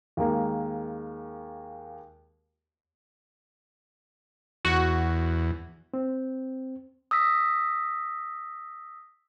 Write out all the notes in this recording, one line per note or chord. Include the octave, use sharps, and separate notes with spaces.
D#2 G#3 A#3
E2 F#4
C4
D#6 E6 A#6 B6